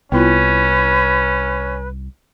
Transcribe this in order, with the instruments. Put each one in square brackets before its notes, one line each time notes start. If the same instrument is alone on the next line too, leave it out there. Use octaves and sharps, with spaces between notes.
[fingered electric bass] C2 [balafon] B3 E4 F4 [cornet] C#4 [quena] B4